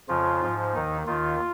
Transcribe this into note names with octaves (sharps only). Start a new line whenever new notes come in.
F2 C#3 F3 F4
G#2 F3
D#2 D#3 D#4
D#2 D#3 F4